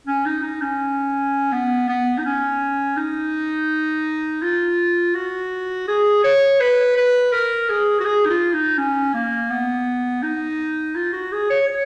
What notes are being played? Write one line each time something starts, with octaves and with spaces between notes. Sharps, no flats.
C#4
D#4
D#4
C#4
B3
B3
D#4
C#4
D#4
F4
F#4
G#4
C#5
B4
B4
A#4
G#4
F#4
G#4
D#4
F4
D#4
C#4
A#3
B3
D#4
F4
F#4
G#4
C#5
C#5